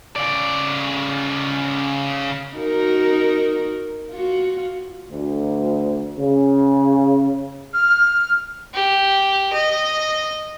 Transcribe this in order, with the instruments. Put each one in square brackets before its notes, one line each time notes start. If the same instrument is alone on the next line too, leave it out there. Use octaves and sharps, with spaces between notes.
[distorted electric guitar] C#3 D5
[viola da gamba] D#4 F#4 A#4
F4 F#4
[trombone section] D2
C#3
[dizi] F6
[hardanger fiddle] G4
D#5